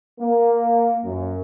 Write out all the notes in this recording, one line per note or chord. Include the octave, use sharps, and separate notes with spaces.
A#3
F#2